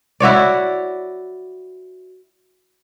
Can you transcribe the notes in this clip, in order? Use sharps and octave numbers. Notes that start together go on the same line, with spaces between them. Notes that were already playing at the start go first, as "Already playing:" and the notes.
E4 F#4 C#5 D5